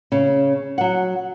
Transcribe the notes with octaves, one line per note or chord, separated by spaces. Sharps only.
C#3
F#3 F#5